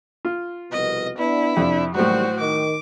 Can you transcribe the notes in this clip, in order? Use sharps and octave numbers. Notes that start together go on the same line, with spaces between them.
F4
C2 F2 B2 D#5
B3 D4 E4
F2 C3 D4
A1 D#2 A2 F#3 G3 F#4 C5
D#3 D6